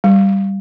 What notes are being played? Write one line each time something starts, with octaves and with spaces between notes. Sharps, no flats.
G3